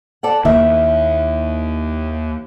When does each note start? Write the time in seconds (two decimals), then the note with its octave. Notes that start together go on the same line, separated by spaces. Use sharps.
0.23 A4 D5 F#5
0.45 D#2 D#3 A#3 E4 E5